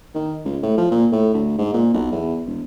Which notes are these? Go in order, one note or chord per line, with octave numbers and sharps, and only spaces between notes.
D#3
C#2
A2
F3
A#2
A2
D2
G#2
A#2
B1
E2
E1